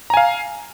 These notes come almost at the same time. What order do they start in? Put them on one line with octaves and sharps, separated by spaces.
A#5 G#5 F5